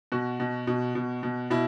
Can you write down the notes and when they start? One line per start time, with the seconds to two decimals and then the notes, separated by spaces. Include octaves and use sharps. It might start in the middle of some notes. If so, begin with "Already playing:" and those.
0.12 B2 F#4
0.40 B2
0.67 B2
0.95 B2
1.23 B2
1.50 B2 E4